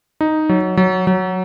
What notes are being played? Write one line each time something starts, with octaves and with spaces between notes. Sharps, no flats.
D#4
F#3
F#3
F#3